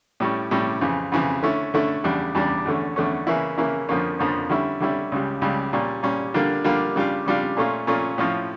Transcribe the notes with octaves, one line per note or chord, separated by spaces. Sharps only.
A2 G3 C#4
A2 G3 C#4
F2 C#3 E3
F2 C#3 E3
D3 A3 C#4 E4
D3 A3 C#4 E4
E2 C#3 G3 D4
E2 C#3 G3 D4
E2 D3 A3 C#4
E2 D3 A3 C#4
C#3 E3 A#3 C#4 E4
C#3 E3 A#3 C#4 E4
F2 D3 F3 A#3 C#4
F2 D3 F3 A#3 C#4
D3 G3 C#4 E4
D3 G3 C#4 E4
C#2 C#3 G3
C#2 C#3 G3
A#2 G3 C#4
A#2 G3 C#4
D3 G3 A#3 D4 F4
D3 G3 A#3 D4 F4
C#3 G3 D4 F4
C#3 G3 D4 F4
A#2 A3 C#4 F4
A#2 A3 C#4 F4
A2 F3 C#4 F4